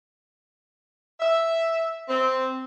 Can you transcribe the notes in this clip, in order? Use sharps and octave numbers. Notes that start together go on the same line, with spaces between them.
E5
C4